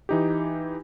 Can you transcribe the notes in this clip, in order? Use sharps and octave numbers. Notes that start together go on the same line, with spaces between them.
E3 D#4 G4